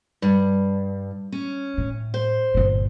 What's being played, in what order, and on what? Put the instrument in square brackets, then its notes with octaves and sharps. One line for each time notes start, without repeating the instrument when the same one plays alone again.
[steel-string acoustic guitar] G2
C#4
[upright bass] A2
[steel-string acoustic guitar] C5
[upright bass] G1 A#2